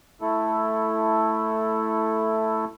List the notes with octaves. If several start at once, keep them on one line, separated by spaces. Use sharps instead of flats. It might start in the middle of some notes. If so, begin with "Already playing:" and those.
A3 E4 A4